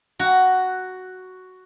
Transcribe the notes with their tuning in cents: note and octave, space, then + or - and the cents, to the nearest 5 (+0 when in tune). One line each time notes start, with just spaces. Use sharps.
F#4 +5 A#5 +0